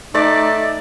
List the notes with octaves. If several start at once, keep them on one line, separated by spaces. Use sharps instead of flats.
A3 D#4 D5 D6